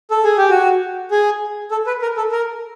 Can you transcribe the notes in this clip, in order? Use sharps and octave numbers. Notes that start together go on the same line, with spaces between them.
A4
G#4
G4
F#4
G#4
A4
B4
A#4
A4
A#4